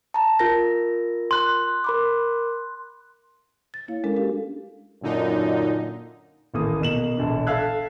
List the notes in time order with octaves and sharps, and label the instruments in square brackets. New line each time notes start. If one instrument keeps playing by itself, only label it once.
[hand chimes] A5 A#5
F4 A#4 A#6
[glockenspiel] C6 F#6
[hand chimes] A#4 B5 D6
[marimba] A6
A#3 E4 C#5 F5
G#3 C#4 D4 A4 A#4
D4 F#4 G4 A4 F5
[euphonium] F#2 [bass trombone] A#2 [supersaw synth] D3 D#4
[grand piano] D#1 A1 A#3 D#6
B2 A#3 E7 F#7
E1 A#1 D3
A4 E5 F5 E6 F#6 G#6